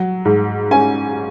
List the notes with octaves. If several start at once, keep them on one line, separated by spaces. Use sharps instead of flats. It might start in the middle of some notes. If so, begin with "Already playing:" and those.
Already playing: F#3
G#2
C#4 G#5